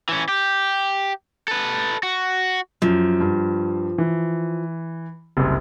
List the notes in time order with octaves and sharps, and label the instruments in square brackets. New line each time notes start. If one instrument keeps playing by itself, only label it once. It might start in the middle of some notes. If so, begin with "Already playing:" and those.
[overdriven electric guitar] E3 C#4
G4
A4 B4
F#4
[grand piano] F#2 [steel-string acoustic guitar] F3
[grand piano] G2
E3
F#1 C2